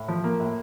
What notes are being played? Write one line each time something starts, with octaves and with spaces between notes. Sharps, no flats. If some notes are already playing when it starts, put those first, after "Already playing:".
Already playing: A2
F3
A#3
A2